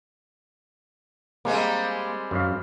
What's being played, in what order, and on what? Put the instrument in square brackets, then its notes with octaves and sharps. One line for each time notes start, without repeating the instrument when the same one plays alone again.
[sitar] G3 G#3 C4 [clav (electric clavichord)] A#3
[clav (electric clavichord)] F#2 F5